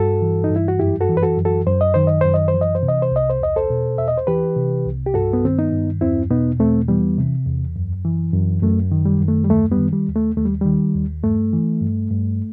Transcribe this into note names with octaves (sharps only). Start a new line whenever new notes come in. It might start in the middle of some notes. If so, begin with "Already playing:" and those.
Already playing: G2 F#4 A4
E3
D#4
G2
E4
F#4
F#2 E4 G4
F#4 A4
E3
B4
F#4 A4
F#2
F#4 A4
F#2 C5
D#5
D#3 C5
D#5
F#2 C5
D#5
C5
E3
D#5
C5
C3
D#5
C5
C2 D#5
C5
E2 D#5
A4 C5
B2
E2 E5
D#5
C5
E3 G4 B4
C3
C2
G4
G2 F#4 A4
B3
D#3 C4
B3 D#4
G2
E2 C4 E4
B2 B3 D#4
E2 A3 C4
E3 G3 B3
C3
E2
F#2
E3
F#2
F#2 A3
D#3
G3
F#2
A3
G3
D#2 A3
G3 B3
D#3
G3
D#2
A3
D#2 A3
G3
D#3 G3
D#2
G2 A3
E3
G2
G2